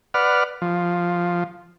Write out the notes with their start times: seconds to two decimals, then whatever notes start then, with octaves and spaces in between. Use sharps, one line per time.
0.14 B4 D5 F#5 F6
0.62 F3